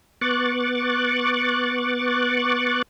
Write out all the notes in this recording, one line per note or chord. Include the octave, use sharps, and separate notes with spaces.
B3 C#6 D6 F#6 A6